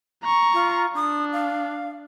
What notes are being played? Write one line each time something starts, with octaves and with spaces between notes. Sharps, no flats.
A#5 C#6
F4
D4 D#6
F5